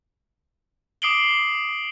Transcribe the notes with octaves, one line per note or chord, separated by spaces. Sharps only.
D6 D#6 C7 D7 F#7 G7